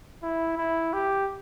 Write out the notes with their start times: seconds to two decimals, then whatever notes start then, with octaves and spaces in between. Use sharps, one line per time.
0.23 E4
0.58 E4
0.93 G4